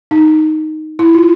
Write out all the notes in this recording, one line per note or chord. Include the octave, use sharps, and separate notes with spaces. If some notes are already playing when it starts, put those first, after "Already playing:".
D#4
E4
F4